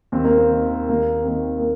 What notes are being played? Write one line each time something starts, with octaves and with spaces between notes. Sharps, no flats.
D#2 C4
A#3
C4
D#3
D#2 A#3
C4
D#3 A#3
A#3